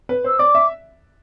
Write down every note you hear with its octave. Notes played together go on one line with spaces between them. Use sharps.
B4
C5 E6
D5 D6
E5